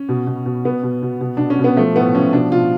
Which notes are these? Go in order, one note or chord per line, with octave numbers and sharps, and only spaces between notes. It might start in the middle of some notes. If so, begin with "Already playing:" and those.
Already playing: C#4
B2
B2
B2
B2 B3
B2
B2
B2
B2 D4
C#4
B2
B3
F3 A3
A2 B3
F3 C#4
B2 D4
B2 F4